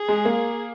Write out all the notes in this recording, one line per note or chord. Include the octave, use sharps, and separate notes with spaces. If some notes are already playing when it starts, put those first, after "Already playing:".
Already playing: G#4
G#3
A#3